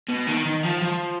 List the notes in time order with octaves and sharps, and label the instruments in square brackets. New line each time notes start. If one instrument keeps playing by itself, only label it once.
[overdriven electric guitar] B2
D#3
D#3
F3
F3